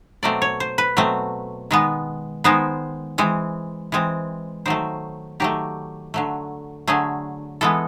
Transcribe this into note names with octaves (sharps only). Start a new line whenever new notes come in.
B2 F#3 A3 C4 D5
C#5
C5
B4
B2 F#3 A3 C4
D#3 G#3 B3
D#3 G#3 B3 C5
E3 G#3 C4
E3 G#3 C4
D#3 F#3 A3 C5
D#3 F#3 A3 G4
D3 F#3 A3
D3 F#3 A3 G#4
E3 G#3 B3 A4